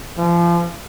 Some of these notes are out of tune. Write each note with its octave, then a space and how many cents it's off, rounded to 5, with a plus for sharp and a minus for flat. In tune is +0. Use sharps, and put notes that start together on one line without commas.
F3 -30